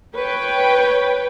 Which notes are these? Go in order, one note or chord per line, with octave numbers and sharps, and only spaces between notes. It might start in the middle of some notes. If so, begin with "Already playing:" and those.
B4 C#5 G5